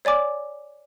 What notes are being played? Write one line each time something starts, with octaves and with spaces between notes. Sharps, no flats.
C#5 D5 G#5 D6